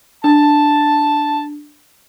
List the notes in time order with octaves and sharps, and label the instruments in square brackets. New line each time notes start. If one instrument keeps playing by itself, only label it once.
[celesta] D4 [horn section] A5